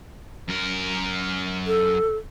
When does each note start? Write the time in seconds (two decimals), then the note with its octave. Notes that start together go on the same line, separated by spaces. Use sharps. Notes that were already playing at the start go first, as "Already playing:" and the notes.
0.49 F#2 A#4
1.67 A4